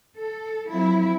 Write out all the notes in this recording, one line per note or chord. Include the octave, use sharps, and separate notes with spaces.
A4
F3 F#3 C4 E4